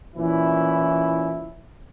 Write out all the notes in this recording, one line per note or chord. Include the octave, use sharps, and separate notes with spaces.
A#2 E3 C#4 E4